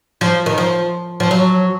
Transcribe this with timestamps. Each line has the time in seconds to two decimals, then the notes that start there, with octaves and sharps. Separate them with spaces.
0.21 F3
0.46 D#3
0.58 F3
1.20 F3
1.31 F#3